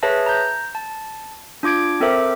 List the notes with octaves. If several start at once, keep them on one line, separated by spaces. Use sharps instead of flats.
G#4 B4 C#5 E5 A5 A#6
A#5 G6
A5
D4 F4 D6 G#6 D7
C4 A4 A#4 C5 E5 D6